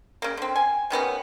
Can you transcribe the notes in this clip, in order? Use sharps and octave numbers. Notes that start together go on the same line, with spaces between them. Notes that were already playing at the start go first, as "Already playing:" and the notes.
C#3 A#3
D3 C4
G#5
C3 D#3 B3 C#4